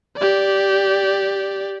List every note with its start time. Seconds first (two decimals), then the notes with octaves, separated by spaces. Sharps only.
0.17 G4 D5